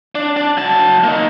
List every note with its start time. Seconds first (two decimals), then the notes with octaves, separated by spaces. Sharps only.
0.15 D4
0.37 D4
0.57 F#3 A5
1.04 A#3 D#4